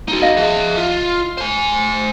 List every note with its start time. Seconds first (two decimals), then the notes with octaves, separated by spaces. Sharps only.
0.08 D#4 F#4
0.22 D#5 F5 A#6
0.37 G#4 E5
0.77 F4
1.38 C5 G#5